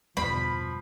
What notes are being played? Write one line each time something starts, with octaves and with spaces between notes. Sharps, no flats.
G1 E2 B2 F3 G3 B5